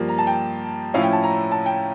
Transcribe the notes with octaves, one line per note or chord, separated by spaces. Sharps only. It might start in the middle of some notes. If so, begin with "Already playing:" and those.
Already playing: G2 F3 A#3
A#5
A5
G5
A2 F3 C#4 E4 F5
G5
A5
A#5
A5
G5